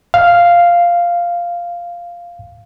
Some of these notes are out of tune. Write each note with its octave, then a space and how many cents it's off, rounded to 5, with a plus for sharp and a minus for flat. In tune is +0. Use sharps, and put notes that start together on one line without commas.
F5 -5